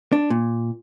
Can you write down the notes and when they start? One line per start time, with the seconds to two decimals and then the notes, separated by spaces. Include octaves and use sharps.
0.12 D4
0.30 A#2